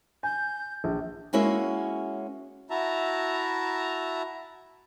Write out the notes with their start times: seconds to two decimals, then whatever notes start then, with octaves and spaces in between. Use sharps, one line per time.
0.23 G#5 G6
0.84 A#1
1.33 G#3 A#3 C#4 E4 F#4 E5
2.70 E4 F#4 E5 A5 A#5